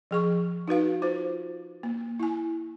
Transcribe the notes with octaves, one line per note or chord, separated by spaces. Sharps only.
F3 G#4 C#6
D#4 F#4 B4 F5
F4 C5
A#3
E4 G#5